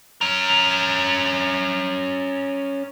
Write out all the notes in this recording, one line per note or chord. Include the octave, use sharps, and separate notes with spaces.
C#4 A#4